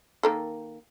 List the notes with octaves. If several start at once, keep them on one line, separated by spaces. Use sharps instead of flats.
D#3 A#3 A4